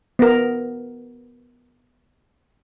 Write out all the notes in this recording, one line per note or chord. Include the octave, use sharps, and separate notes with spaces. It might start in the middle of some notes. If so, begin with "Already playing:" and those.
B3 A#4